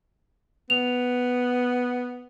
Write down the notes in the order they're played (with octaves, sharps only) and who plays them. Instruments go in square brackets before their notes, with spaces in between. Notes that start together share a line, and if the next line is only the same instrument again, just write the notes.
[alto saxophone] B3 [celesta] F7